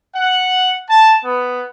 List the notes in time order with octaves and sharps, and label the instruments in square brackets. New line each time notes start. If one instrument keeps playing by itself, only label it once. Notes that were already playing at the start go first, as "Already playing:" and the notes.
[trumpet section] F#5
A5
B3